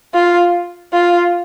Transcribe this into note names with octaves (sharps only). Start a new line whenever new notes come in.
F4
F4